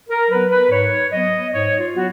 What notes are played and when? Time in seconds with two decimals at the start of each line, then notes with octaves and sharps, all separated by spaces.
0.09 A#4
0.30 F#3 B3 B4
0.50 B4
0.70 G#2 C#5
1.11 F#3 B3 D#5
1.52 G#2 C#5
1.79 F4
1.93 F#3 B3 F#4